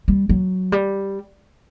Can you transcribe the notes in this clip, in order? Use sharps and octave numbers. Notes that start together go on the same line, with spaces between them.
G3
F#3
G3